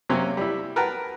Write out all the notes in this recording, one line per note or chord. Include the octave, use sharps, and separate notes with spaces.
C3 F#3 A#3 C4 C#4
G3 E4
A#4 B4 F#5 G5 A5 A#5